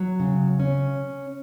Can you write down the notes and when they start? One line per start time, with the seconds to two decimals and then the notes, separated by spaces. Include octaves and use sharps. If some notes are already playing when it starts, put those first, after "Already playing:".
Already playing: F#3
0.20 C#3
0.60 C#4